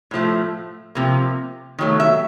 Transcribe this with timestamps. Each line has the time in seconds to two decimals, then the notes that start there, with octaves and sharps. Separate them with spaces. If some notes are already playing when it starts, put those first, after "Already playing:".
0.11 A2 F3 A3
0.95 C3 F3 A#3
1.79 D#3 F#3 A3
2.00 E5